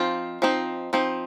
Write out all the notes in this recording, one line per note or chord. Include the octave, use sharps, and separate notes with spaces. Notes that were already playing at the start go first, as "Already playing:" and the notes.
Already playing: F3 C4 D#4 F4
F3 C4 D#4
F3 C4 D#4